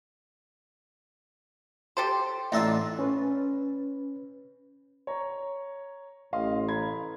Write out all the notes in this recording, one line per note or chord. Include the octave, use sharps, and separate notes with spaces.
G4 A4 C5
A1 D4 D#4 F4 E5
C#4 B4
C#5 A#5
A1 D#5 F5 C6
A#5 B5 G#6